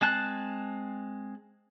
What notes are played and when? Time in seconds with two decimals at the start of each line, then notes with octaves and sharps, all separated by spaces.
0.01 G#3 C4 A5 F#6